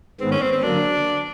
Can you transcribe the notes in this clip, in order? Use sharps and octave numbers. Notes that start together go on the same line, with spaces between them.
G#2 D#3 G#3 B3 C4
C#4
C4
C4
D3 F#3 A#3 D4